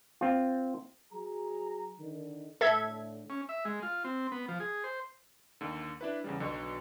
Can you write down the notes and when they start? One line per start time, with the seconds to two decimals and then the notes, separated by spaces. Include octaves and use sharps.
0.21 C4 F4
1.13 F#3 G#4 A#5
2.00 D3 D#3
2.61 A2 D3 A4 E5 G#6
3.30 C#4
3.49 E5
3.65 G#3
3.83 F4
4.05 C4
4.32 B3
4.48 F3
4.60 G#4
4.84 C5
5.61 D#2 D3
6.01 D4 E4 B4
6.24 E2 C#3 G3
6.40 B1 D3 C#6